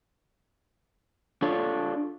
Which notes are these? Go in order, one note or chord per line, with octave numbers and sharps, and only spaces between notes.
D4 F4 A4 C#5